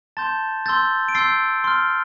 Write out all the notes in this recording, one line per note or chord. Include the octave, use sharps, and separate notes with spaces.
A5 C6 G6 A6
C6 E6 G6 A6
D7
C6 E6 G6 A6 C7
C6 F6